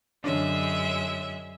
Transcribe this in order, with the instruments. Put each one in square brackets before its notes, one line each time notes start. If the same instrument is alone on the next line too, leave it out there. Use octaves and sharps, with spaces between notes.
[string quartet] F#2 G#3 E5 [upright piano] D3 C#4 D4